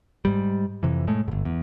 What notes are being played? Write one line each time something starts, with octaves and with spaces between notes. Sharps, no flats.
G#2 G3
F2 C3 E3
A2 G#3 A3
G1 G#2
E2